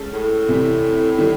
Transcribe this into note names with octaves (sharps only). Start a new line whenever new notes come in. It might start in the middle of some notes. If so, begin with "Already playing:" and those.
Already playing: G#3 C#4 A4
A2
C3 E3 G3
D#3 G3